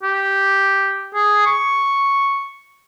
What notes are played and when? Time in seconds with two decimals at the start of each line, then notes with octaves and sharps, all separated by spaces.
0.03 G4
1.15 G#4
1.46 C#6